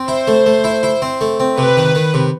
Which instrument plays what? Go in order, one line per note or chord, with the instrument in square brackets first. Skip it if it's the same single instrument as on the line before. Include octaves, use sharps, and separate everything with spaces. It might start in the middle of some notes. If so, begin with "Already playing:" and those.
Already playing: [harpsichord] C4
[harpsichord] E4 [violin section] C5
[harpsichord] A3
A3
E4
E4
C4
A3
C4
[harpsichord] C3 [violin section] B4
[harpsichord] D#3
D#3
C3